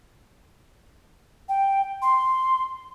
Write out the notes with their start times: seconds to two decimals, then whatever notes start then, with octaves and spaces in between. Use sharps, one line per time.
1.49 G5
2.02 C6